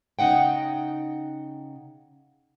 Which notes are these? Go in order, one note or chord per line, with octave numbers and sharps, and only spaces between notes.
C#3 D#4 F#5 G5